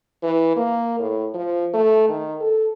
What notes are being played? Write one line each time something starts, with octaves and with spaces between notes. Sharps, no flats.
E3
A#3
A2
F3
A3
D#3
A4